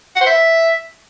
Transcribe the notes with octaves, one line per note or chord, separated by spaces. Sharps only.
F#5
C5
E5